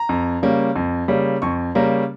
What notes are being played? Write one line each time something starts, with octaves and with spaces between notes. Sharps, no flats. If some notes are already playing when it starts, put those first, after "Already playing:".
Already playing: A#5
F2
C#3 G3 A#3 C#4
F2
C#3 G3 A#3 C#4
F2 C#6
C#3 G3 A#3 C#4 A#5